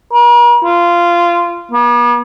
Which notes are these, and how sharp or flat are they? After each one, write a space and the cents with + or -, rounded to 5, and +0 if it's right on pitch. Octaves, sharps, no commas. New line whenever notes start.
A#4 +45
F4 -15
B3 -45